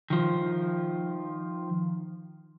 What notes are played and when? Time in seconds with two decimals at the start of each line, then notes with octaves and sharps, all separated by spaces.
0.10 D#3 F3